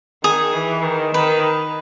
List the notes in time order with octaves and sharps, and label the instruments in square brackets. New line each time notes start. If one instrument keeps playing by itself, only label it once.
[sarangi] D#3 [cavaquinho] G#4
[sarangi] E3
D#3
[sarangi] D#3 [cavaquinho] B4